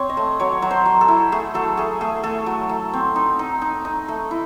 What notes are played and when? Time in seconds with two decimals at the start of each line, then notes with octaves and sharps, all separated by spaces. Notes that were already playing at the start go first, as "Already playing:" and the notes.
Already playing: C4 C#5
0.09 D#5
0.17 A3
0.40 F#3 C#5
0.62 F#3
0.71 C5
0.85 F#3
1.01 A4
1.08 E4
1.32 A3 G#4
1.54 F#3 A4
1.77 A3 G#4
2.01 A3 G#4
2.23 A3 A4
2.46 F#3
2.69 A3
2.93 C4
3.16 D#4
3.39 D#4
3.61 D#4
3.85 D#4
4.08 A3
4.31 E4